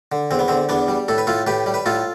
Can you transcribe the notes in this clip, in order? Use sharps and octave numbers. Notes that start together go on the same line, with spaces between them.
D3
E2 C4
B3
D3 C4
E2 B3 D4
G3
A2 A4
B4
A2 F4 A4
A2 G4 B4
G3
B4
A2 F4 A4